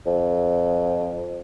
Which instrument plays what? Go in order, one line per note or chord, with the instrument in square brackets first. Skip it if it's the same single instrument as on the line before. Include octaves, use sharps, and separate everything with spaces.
[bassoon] F2